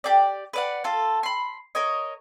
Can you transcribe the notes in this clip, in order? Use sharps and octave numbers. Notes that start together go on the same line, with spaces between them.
G4 G#4 D5
B4 D5 F#5
F4 A4
B5 C6
A#4 C#5 D#5